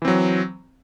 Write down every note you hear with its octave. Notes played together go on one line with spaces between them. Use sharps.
E3 F#3 C4